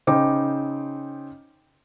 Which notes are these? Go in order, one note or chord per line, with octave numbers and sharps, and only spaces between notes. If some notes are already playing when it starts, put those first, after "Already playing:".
C#3 D#4 C5 G5 D6